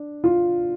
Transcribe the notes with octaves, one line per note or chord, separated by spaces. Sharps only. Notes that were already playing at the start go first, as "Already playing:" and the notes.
Already playing: D4
F4